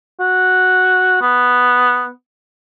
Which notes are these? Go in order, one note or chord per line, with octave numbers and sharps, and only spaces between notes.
F#4
B3